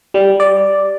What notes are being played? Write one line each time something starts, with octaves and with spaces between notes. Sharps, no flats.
G3
D5